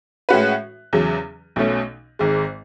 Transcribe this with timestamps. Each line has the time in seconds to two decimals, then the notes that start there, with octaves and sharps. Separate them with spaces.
0.29 A2 G#3 C#4 F#4 B4
0.93 E2 C#3 F#3
1.56 B1 B2 A3 C#4
2.19 G#1 G#2 G#3